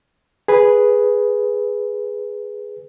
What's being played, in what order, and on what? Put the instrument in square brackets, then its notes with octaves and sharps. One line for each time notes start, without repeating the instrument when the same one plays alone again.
[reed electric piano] G#4 B4